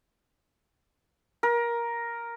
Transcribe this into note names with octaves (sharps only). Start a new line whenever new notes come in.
A#4